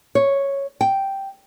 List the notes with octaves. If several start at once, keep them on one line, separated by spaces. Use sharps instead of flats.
C#5
G5